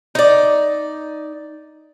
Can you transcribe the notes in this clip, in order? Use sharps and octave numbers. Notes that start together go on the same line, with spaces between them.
D#4 D5